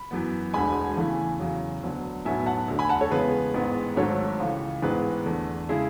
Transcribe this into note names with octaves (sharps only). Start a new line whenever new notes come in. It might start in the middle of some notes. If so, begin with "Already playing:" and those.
Already playing: B5
F#2 E3 B3
E1 D2 D3 G#3 G#5 B5
E2 C#3 E3 A3
E2 C#3 F#3
D2 D3 F#3 B3
B1 A2 F#3 B3 E5 G#5
F#5 A5
D2 D3 A3
G#5 B5
F#5 A5
A4 C#5
E2 C#3 G#3 B3 G#4 B4
A1 G#2 G#3 B3
G#1 G#2 F#3 A3 A4 C#5
C#2 C#3 E3
A1 G#2 E3 B3 G#4 B4
E2 D3 A3
C#3 G#3 E4 G#4